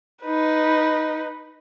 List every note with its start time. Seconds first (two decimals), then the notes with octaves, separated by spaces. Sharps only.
0.24 D#4 B4